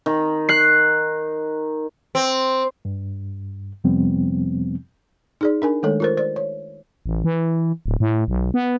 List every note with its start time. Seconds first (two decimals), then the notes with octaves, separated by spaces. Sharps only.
0.06 D#3
0.49 F#6 C7
2.15 C4
2.85 G2
3.84 F2 C3 F3 G3 B3 C4
5.41 D#4 G#4 D5
5.62 D4 A#4 G#5
5.83 D#3 G#3 A3 A4 C#5
6.00 F4 A#4 C5
6.17 C5 D5
6.36 C#5
7.06 A1
7.24 E3
7.86 D1
8.00 A2
8.28 B1
8.54 B3